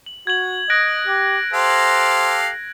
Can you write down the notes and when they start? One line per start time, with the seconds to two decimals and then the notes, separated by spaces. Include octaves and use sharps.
0.06 F#7
0.27 F#4 G#6 F#7
0.70 D#5 F#6 A#6 D7
1.07 G4
1.53 G4 A4 C5 F5